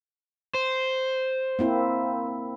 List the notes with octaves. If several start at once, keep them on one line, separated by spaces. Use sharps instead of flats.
C5
A#3 C4 E4